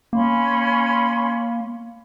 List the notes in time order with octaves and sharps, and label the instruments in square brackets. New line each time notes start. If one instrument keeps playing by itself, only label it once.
[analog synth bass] A#3 [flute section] C#4 B5 C6